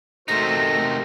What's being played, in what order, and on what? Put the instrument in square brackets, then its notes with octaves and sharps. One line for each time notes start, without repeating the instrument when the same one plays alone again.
[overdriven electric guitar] C3 D#4 [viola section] A3 [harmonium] F#4 A#4 C5 [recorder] A#6